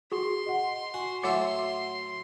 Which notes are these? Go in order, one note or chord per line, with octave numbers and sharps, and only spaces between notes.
F#4 G#4 C6
D#5 F#5
F#4 G#5
A2 F#3 E5 F#5 C6 D6 A6 C#7